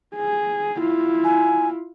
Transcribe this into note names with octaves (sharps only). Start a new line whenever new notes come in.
G#4
E4 F4
G#5